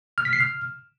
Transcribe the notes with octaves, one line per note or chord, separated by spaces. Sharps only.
F6
B6
C7
F6